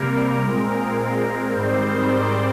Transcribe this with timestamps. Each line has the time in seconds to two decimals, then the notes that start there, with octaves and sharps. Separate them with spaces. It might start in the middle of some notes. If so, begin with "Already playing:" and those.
Already playing: C3 G3 A#3 A#4
0.41 A#2 G#3 C4
1.51 G#2 D#3 G3 C4 C5
2.06 D5